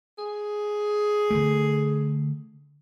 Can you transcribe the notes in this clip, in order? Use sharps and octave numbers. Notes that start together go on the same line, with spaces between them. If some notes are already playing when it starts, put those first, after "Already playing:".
G#4
D3 A3